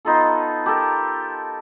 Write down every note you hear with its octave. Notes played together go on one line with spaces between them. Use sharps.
B3 D#4 F4 A4
G4 A4 A#4